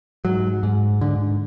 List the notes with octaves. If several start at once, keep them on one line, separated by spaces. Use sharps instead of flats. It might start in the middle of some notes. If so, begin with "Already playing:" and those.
G#2 F#3
G#2
G#2 D3